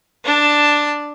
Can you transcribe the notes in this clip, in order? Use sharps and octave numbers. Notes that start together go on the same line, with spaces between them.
D4 A5